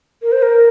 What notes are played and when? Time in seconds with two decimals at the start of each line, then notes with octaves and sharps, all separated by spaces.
0.22 A#4
0.32 C5
0.42 A#4